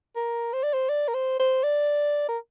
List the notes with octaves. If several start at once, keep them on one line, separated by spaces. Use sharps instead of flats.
A#4
C5
D5
C5
D5
A#4
C5
C5
D5
A#4